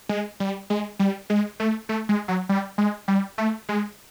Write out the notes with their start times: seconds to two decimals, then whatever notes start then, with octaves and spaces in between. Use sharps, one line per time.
0.09 G#3
0.40 G3
0.70 G#3
0.99 G3
1.30 G#3
1.60 A3
1.89 A3
2.09 G#3
2.28 F#3
2.49 G3
2.78 G#3
3.08 G3
3.38 A3
3.69 G#3